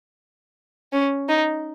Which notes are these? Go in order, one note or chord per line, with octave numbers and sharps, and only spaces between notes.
C#4
D#4